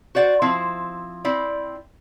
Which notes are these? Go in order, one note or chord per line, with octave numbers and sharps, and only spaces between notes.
F#4 C5 D5 F#5
F3 C4 E4
C4 E4 D5